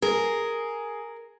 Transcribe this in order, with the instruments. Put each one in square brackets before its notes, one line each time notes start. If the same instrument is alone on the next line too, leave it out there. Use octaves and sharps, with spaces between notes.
[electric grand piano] G#4 [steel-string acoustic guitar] A#4